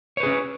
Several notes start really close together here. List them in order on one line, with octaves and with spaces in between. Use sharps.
C#5 B4 G#4 C#4